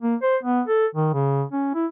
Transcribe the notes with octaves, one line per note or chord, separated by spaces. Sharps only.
A#3
C5
B3
A4
D#3
C#3
C#4
E4